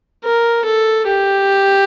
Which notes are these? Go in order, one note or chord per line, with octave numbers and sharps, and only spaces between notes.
A#4
A4
G4